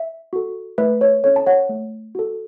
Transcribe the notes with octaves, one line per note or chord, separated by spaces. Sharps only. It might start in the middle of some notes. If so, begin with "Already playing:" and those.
Already playing: E5
F#4 A4
A3 B4 E5
C#5
C#4 A4 C#5
A5
C#5 F#5
A3
F#4 A4